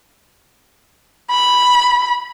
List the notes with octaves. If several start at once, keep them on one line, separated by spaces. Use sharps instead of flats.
B5